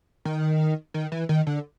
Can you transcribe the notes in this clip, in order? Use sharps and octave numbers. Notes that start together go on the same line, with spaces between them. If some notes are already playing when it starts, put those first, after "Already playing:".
D#3
D#3
E3
D#3
D3